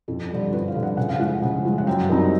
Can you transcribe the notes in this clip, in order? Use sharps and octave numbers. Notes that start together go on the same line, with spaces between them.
F2 A4
D3 G3
F2 B4
F5
D3 G3
F#5
C#3 F#5
F5
F3 G#3 F#5
C#3
F3 G#3
F#5
F#2 G5
D#3 G3 C4 D#4